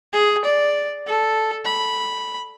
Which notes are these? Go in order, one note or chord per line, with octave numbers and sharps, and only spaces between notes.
G#4
D5
A4
B5